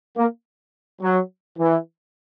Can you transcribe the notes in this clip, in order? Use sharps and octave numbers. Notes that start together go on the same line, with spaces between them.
A#3
F#3
E3